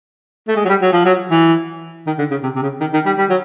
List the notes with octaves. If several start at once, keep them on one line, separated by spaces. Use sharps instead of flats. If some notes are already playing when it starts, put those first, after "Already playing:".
A3
G#3
F#3
G3
F#3
F3
F#3
E3
D#3
D3
C#3
C3
C3
C#3
D#3
D#3
G3
G3
F#3